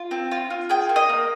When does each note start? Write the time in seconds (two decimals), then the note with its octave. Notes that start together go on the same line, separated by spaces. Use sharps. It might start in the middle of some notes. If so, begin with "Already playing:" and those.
Already playing: F4
0.11 C4
0.31 F4
0.50 F4
0.70 G#4 G5
0.89 A#3
0.96 D#5
1.09 A#3